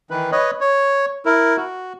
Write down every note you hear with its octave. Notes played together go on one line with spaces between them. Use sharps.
D#3 E3 B4
B4 C#5 D#5
C#5
E4 A#4
F#4